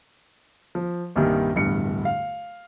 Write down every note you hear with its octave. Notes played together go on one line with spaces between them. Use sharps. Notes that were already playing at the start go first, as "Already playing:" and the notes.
F3
C2 G2 A#2 D#3 G3
D1 E2 G2 C#7
F5